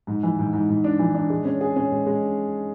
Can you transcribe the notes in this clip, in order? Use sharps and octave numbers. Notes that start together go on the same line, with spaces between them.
G#2
E3
G#2
G#2
G#2
D4
E3
D4
G#3
C#4
G#4
C#4
G#3
G#3